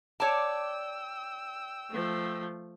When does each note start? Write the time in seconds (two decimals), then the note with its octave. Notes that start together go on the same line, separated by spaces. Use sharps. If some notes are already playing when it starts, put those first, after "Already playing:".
0.20 C#5 D5 G5 A5 D6 E6
1.90 F3 A3